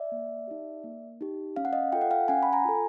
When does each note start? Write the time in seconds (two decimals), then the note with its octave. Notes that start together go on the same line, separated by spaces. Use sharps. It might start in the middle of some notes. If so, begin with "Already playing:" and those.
Already playing: D5 E5
0.12 A#3
0.47 D#4 G4
0.84 A#3
1.21 D#4 G4
1.56 C#4 F5
1.65 F#5
1.73 D#5 F5
1.92 F4 A4 G5
2.01 F#5
2.11 F5 G5
2.28 C#4 F#5 G#5
2.43 B5
2.53 G#5 A#5
2.65 F4 A4